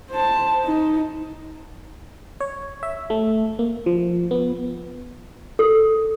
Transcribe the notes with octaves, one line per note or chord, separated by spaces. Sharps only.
C5 A5
D#4
C#5
E5
A3
A#3
F3
B3
A4